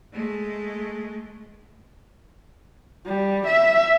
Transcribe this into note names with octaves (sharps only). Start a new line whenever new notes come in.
G#3 A3
G3
E5